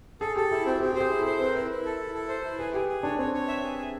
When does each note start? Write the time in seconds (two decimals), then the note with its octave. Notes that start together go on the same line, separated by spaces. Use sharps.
0.21 G#4 A4
0.36 G4 A4
0.51 E4 G4
0.66 C4 F#4
0.80 C4 G4
0.92 G4 C5
1.01 G#4
1.10 E4
1.21 A4
1.26 C5
1.40 C4 B4
1.49 A#4
1.55 E4 B4
1.70 E4
1.85 A4
2.00 E4
2.15 A4
2.29 C5
2.44 E4
2.59 G#4 B4
2.73 G4 G#4
2.88 G#4
3.03 D4 C#5
3.19 C4 C#5
3.34 C#5
3.48 E5
3.63 G#4
3.78 G#4